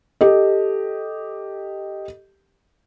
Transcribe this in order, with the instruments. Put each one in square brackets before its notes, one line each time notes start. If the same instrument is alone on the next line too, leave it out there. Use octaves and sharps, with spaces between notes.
[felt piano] G4 A4 D#5